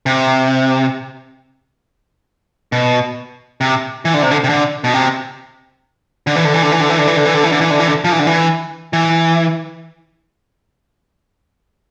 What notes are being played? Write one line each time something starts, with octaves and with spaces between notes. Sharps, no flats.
C3
B2
C3
E3
D3
C3
D3
C3
D3
B2
C3
D3
E3
D3
E3
D3
E3
D3
E3
D3
E3
D3
E3
D3
E3
D3
E3
D3
E3
D3
F3
E3
D3
E3
E3